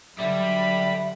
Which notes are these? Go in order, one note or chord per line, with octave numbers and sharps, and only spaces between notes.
D3 F#3 G3 E5 B5